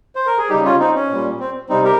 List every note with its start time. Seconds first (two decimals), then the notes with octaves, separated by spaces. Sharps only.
0.16 C5
0.27 A#4
0.38 G#4
0.49 C#3 G3 D#4 G4
0.65 C#4 F4
0.80 C4 D#4
0.95 C#4
1.10 A#2 G3
1.40 C4
1.69 C3 G3 C4 D#4
1.84 G4 A#4